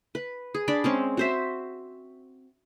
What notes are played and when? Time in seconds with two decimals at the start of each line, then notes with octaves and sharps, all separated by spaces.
0.15 B4
0.55 G#4
0.68 D4 D5 B5
0.84 G#3 C4 C#4
1.17 F#4 C5 E5